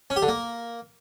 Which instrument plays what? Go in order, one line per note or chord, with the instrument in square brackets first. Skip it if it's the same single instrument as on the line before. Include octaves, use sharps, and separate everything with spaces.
[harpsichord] C#4
G4
D3
A#3